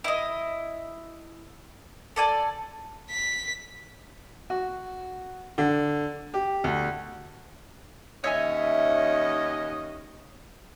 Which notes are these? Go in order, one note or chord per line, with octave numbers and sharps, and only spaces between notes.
E4 D#5
A4 D5 G#5
B6
F#4
D3
G4
D2
D#2 C#4 C#5 D#5 E5 G#5